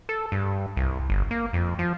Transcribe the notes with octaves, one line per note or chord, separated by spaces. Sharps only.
A4
G2
C2
G1
A#3
F2
F3